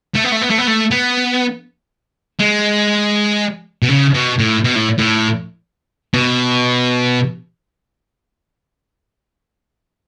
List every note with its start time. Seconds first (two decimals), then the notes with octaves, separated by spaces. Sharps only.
0.16 A3
0.25 B3
0.33 A3
0.42 B3
0.51 A3
0.59 B3
0.68 A3
0.91 B3
2.40 G#3
3.82 B2
3.89 C#3
4.14 B2
4.39 A2
4.64 B2
4.76 A2
4.98 A2
6.14 B2